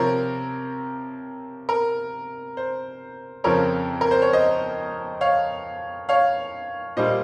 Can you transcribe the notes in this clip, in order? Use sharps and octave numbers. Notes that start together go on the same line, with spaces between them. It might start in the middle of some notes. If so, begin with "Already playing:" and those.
Already playing: C3 F3 C4 A#4 C#5
A#4
C5
F2 C#3 F3 C4 A#4 C#5
A#4
C5
C#5
C5 D#5
C#5 F5
C#5 F5
A#2 G3 A#3 C5 D#5